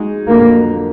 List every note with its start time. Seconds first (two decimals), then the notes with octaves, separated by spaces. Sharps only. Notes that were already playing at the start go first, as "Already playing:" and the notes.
Already playing: G#3 D#4 F#4
0.27 F2 D3 F#3 A#3